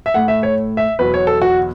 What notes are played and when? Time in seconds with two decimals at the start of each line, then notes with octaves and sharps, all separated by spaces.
0.06 E5
0.14 A2 A3 F#5
0.28 E5
0.43 C#5
0.77 E5
0.99 E2 B2 F#3 B4
1.14 C#5
1.27 A4
1.42 F#4